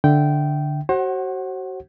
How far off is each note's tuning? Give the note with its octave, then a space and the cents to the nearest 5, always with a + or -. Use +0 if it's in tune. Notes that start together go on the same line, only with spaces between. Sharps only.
D3 +0 E5 +0 G5 -15
F#4 +35 C5 +40 F#5 +10